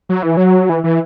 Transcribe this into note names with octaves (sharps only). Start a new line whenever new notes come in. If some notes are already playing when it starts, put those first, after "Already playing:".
F#3
E3
F#3
E3
E3